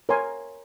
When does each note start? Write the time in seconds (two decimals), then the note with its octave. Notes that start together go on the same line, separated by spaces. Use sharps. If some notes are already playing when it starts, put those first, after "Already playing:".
0.09 A#4 C#5 G#5 C6